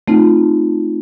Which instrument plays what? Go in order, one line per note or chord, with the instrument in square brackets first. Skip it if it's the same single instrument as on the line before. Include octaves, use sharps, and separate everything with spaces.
[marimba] A3 C4 D#4 F4